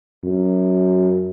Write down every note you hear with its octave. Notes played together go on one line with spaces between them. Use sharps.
F#2